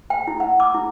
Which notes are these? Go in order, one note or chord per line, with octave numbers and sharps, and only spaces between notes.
G5
E4
F#5
D6
E4